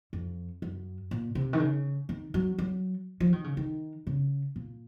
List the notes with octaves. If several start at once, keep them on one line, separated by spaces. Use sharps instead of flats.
F2
F#2
A#2
C3
D#3
C#3
D#3
F#3
F#3
F3
D#3
C#3
D#3
C#3
A#2